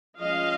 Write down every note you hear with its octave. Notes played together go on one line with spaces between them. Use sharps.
F3 G#3 C#4 D#5 F5